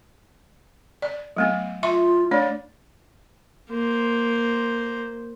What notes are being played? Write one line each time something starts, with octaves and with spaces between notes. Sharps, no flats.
D5
F#3 A3 B3
F4 E5 C6 C#6
A3 D4 C#5 D5
A#3 C5